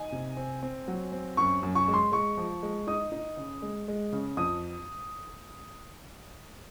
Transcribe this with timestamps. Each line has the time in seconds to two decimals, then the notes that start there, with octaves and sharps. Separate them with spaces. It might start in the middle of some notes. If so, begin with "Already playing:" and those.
Already playing: D#4 G#5
0.12 C3
0.37 C4
0.63 C4
0.88 F#3
1.12 C4
1.37 F#2 C#6
1.63 F#2
1.75 C#6
1.88 G#3
1.94 C6
2.12 G#3 C#6
2.37 F3
2.63 G#3
2.87 D#4 D#6
3.12 D#4
3.37 C#3
3.62 G#3
3.88 G#3
4.13 C#3
4.37 F2 D#6